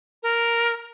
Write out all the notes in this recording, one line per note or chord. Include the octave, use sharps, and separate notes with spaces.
A#4